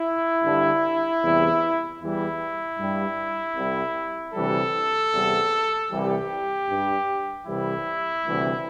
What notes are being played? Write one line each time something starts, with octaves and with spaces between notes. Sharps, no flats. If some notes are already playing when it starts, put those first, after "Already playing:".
Already playing: E4
G2 D3 G3
E2 C3 E3 G3
E2 E3 G3 E4
G2 G3
C2 C3 G3
D2 C3 E3 G3 A4
E2 C3 G3
C2 C3 E3 G3 G4
G2 G3
C2 C3 E3 G3 E4
D2 C3 E3 G3